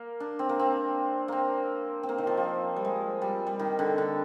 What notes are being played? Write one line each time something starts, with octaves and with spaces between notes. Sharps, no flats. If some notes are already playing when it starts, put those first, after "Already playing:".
Already playing: A#3
D4
C4
A#3
C4
A#3 C4
C4
A#3
D#3
F3
F3
G3
G#3
G3
G3
D#3
D3
D3